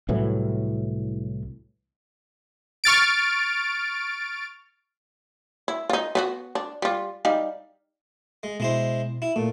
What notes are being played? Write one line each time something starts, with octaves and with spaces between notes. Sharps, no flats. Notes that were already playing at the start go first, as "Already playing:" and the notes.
C2 A2 E3 F#3
C#6 F6 A6 D7
E4
D#4 F4
B3 D4 F#4
D4
G3 F4
G3 D#4 F5
G#3
B2 G#3 E4 C5
E4
A#2 A3